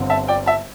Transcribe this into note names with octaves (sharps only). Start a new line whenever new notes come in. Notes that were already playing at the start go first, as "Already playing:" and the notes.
Already playing: G1 G2 D3 C4
E5 A5
D5 G5
E5 A5